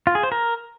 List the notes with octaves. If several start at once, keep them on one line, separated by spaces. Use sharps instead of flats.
F4
G#4
C5
A#4